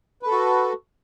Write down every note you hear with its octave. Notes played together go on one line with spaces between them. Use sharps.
F#4 A4 B4